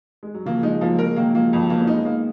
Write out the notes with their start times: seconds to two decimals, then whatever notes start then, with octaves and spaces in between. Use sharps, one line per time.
0.23 G#3
0.34 F#3
0.45 C#3 F3 A#3
0.63 F3 G#3 D#4
0.81 F3 F#3 A#3
0.99 F3 G#3 A#4
1.16 D#3 F#3 A#3
1.34 F3 G#3 A#3
1.52 F2 D#3 F#3
1.70 A#3 B3
1.81 C#4
1.87 G#3 B3 D#4
2.05 A#3